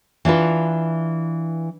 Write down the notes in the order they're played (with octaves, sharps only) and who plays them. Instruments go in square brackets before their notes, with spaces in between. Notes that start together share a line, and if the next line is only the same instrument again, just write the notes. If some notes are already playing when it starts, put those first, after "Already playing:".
[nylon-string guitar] E3 D4 F4 B4